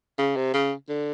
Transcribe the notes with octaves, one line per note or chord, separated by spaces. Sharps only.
C#3
C3
C#3
D3